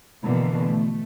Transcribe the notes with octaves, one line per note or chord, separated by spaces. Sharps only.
B2 D3 E3 F3 A#3
A3